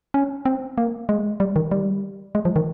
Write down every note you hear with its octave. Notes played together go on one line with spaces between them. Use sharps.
C#4
C4
A#3
G#3
G3
D#3
G3
G#3
F3
D#3